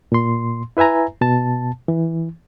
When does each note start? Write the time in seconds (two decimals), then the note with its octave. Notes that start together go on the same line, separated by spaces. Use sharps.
0.12 A#2 C6
0.77 E4 B4 E5 G#5 A#5
1.21 B2 A5
1.88 E3